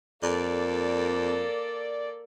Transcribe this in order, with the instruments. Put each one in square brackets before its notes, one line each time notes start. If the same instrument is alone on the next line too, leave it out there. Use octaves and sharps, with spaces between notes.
[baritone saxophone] F2 [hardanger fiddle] A#3 A4 [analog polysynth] D5